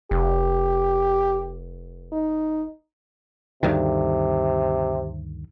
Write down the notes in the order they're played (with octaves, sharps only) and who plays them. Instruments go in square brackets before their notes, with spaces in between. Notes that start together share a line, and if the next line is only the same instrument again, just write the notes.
[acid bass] F1 [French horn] G4
[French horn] D#4
[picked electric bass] D2 G2 D#3 [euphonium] C3